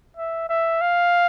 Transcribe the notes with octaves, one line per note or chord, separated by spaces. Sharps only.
E5
E5
F5